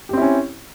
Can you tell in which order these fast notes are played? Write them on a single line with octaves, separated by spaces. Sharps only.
G4 C4 E4 C#4